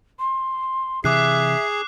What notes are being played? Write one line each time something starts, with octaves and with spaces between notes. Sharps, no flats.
C6
C3 E3 G#4 E5 D6 F#6 C7